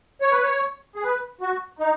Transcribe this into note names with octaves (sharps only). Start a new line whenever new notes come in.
C#5
B4
C#5
G#4
B4
F#4
D#4